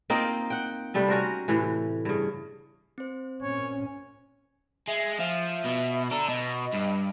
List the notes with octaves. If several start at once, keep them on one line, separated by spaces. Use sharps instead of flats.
A#3 C4 D#4 F4
F#5 G5
C3 G3 A3 B3
C#4 F#4 A#4 C5
A2 C3 E3
G2 C#3
C4 C5
A#2 C#4 C#5
G#3 E5
F3 E5
B2
D4 A4 A#5
B2 D#5
G2